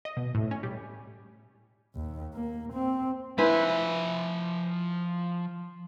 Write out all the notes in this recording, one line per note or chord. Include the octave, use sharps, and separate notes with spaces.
D#5
B2
A2
C#4
G3
D#2
A#3
C4
F3 E4 B4 C5 G#5